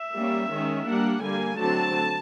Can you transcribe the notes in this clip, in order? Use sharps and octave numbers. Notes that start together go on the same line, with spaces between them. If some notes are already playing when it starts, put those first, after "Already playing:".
Already playing: E5
G3 A#3 C#4
D#3 G#3 C#4
G3 A#3 D4 F#5
D3 G3 A#3 G#5
D3 F#3 A3 C4 A5